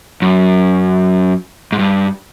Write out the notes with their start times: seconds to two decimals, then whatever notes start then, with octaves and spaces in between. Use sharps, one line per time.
0.22 F#2
1.72 G#2
1.79 G2